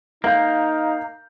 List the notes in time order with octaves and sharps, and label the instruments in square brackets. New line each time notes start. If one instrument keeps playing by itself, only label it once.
[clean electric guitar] A#3 [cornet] D#4 [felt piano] F5 G6